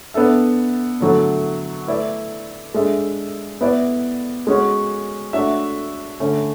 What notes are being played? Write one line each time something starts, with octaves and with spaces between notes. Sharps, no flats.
B3 D4 A4 E5
D3 F#3 A3 E4 A4
A3 E4 B4 D5
G#3 D4 A4 E5
B3 E4 B4 D5
G#3 C#4 F#4 C#5
A3 D4 F#4 C#5 E5
D3 A3 C#4